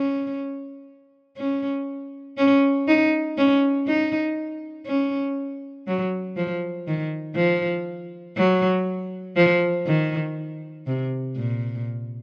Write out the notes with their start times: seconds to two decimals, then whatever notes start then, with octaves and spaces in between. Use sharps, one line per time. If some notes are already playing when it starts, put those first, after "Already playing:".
Already playing: C#4
1.37 C#4
2.37 C#4
2.88 D#4
3.37 C#4
3.87 D#4
4.86 C#4
5.87 F#3
6.37 F3
6.87 D#3
7.36 F3
8.37 F#3
9.36 F3
9.86 D#3
10.87 C3
11.36 A#2